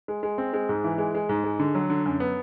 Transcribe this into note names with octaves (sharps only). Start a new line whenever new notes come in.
G#3
G#3
C4
G#3
G#2
E3
G#3
G#3
G#2
G#3
D3
F#3
D3
F#2
B3